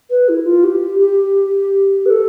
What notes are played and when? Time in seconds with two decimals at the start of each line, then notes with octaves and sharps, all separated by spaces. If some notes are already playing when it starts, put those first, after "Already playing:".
0.10 B4
0.28 E4
0.45 F4
0.63 G4
0.99 G4
2.05 B4
2.09 A4